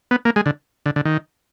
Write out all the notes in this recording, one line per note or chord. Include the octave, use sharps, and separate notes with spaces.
B3
A#3
G#3
D3
D3
D3
D#3